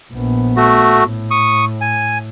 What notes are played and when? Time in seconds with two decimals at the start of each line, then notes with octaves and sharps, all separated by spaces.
0.13 A#1 B3
0.57 A3 F#4
0.95 A2
1.31 C#6 D#6
1.81 G#5